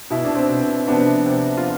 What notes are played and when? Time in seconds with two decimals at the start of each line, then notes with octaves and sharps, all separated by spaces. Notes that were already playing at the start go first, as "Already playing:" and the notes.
0.10 B2 E4
0.24 D4
0.35 C4
0.49 B2
0.87 C3 F3 B3 D4
1.26 C3 F3
1.57 F4